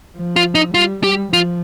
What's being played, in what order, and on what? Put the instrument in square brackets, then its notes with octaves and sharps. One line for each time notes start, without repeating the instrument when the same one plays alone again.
[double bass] F3
[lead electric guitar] F4
D#4
[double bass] G3 [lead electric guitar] F4
[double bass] G3 [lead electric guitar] G4
[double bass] F3 [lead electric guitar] F4